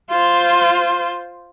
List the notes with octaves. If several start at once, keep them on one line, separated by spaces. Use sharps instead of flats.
F4 C5